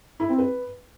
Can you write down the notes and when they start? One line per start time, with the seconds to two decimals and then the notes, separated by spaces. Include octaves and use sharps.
0.20 E4
0.29 C4
0.38 B4